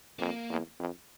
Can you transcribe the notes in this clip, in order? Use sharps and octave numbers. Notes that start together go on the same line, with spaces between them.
F2 A#3
E2
F2